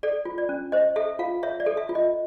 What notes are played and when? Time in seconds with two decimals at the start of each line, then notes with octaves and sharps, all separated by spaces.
0.03 A4 D5
0.25 F4
0.38 D5
0.49 C#4
0.72 C5 D#5
0.96 A4 E5
1.19 F4 F5
1.43 C#5 E5
1.60 D5
1.66 A4
1.77 E5
1.89 F4
1.95 D#5